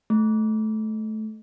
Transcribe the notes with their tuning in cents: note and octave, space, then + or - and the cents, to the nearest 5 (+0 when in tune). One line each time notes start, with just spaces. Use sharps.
A3 -15